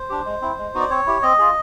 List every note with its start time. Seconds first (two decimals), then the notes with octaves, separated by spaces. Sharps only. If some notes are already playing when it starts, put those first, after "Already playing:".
Already playing: C5
0.10 D4 G4
0.26 G#3
0.42 C4 E4
0.58 G#3
0.74 B3 D#4 F#4
0.80 D5
0.90 C4 C#5
1.07 E4 G4
1.23 C4 D#5
1.39 F4 G#4